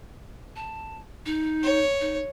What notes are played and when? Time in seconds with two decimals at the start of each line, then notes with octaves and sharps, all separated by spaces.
0.56 A5
1.26 D#4
1.63 C#5
2.00 D#4